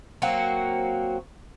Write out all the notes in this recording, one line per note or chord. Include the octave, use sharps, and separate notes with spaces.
F#3 A#3 C4 F#4